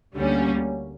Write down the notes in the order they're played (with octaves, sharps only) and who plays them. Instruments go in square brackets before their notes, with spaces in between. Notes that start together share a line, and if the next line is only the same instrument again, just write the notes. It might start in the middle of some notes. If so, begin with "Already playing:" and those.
[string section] D2 D3 G3 A#3 C#4